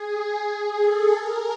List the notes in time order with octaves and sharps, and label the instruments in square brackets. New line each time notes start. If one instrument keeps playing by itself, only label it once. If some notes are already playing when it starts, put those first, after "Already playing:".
Already playing: [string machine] G#4
A4
A#4